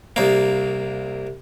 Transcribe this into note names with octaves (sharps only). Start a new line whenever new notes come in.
C2 A#3